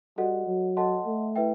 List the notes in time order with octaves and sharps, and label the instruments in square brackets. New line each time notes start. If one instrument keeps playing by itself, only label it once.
[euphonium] G3 [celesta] F#4 A4 D#5 F#5
[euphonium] F#3
[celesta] A4 D#5 F#5 A5 C6
[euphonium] A3
[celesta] E4 B4 E5 G5